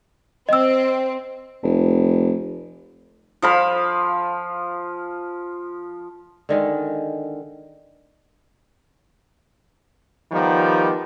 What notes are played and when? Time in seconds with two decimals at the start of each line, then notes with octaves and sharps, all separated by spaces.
0.49 C4 D#5 E6
1.63 F1
3.42 F3 F5 B5
6.49 D3 D#3 G#3
10.32 D#3 F3 G3 B3